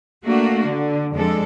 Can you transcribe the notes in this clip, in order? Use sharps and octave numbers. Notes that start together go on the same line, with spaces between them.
A3 A#3 D4 F#4
D3
F2 F3 G#3 D4 A4